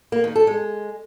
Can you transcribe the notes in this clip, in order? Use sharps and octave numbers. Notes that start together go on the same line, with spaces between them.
A#3
D#3
A4
G#3